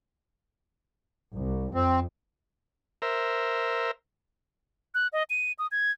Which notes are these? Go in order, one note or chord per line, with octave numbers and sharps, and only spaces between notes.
C2
F2 C4
A#4 C5 E5
F#6
D#5
D#7
D#6
G#6